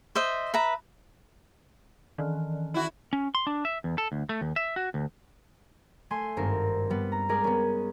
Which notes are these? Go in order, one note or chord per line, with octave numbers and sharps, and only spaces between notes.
C5 D#5 E5
B4 E5 A#5
D#3 E3
E4 F#4
C#4
C6
D4
E5
E2
A4
D2
A3
D#2
E5
F#4
D2
A3 G#5 C6
G#1 G2 C4 A#4
G3 B3
A#5
G#3 G#4 A#4 D5
B3 C#4